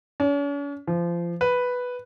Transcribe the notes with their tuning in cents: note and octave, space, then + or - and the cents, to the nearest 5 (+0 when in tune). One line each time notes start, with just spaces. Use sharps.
C#4 +45
F3 -25
B4 +0